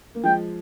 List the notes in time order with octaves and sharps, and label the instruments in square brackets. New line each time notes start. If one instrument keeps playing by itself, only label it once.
[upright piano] A#3
[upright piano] F3 G#3 [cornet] G5